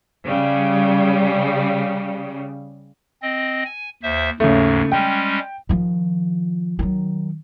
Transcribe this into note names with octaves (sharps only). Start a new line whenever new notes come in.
C#3 G3
C4 D#5
G#5
D#2 C5 E5
D#2 G#2 C#3 A3
G3 G#3 C#4 G5
D#3 F3
D#3 F#3